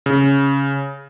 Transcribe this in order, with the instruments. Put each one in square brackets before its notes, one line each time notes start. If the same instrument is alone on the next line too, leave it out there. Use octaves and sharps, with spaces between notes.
[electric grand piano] C#3